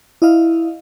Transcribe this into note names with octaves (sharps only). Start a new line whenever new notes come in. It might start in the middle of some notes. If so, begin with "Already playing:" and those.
E4 D#5 F5